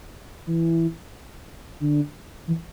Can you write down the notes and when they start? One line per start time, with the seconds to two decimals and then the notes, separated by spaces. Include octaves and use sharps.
0.47 E3
1.81 D3
2.47 E3